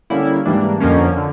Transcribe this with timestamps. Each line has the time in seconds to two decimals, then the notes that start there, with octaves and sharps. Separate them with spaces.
0.10 D3 G3 A#3 C#4 E4
0.45 G#2 E3 G3 A#3 D4
0.80 F2 D3 F3 A#3 C#4
1.17 D3